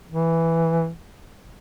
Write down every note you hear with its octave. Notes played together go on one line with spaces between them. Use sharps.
E3